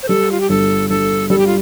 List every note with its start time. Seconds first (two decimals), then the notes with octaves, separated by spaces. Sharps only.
0.03 C5
0.09 G3 A4
0.32 F4
0.41 G4
0.49 G1 A4
0.89 G1 A4
1.30 G3 A4
1.39 G4
1.47 F4